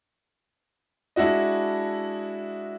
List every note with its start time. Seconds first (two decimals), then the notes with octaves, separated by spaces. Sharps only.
1.16 G#3 D4 E4 F#4 D#5